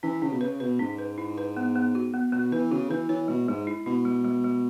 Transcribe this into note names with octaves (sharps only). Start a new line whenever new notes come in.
E3 C#4
C#3 C#4
B2
C#3 B4
B2 B4
G#2 C#4
B4
E4
B4
B3
B3
F#4
B3
B2 B3
E3 B4
C#3 F#4
E3 B4
E3 C#5
B2 G#3
G#2 G#3
E4
B2 E4
G#3
G#3
G#3